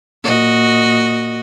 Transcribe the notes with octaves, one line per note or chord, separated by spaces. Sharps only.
A#2 F#4 D#5